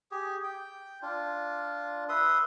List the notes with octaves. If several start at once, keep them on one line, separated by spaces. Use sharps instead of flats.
G4 G#4
G5
D4 F4
B4 E5 C6 D#6